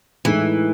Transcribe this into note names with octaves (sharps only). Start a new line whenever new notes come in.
A2 E3 G#3 D#4 A4